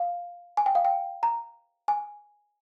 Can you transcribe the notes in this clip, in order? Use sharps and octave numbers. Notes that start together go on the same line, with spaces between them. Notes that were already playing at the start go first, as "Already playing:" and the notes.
Already playing: F5
G#5
G5
F5
G5
A#5
G#5